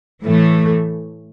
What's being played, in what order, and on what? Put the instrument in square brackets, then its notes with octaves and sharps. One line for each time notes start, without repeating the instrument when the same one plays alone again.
[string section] A2 E3 A3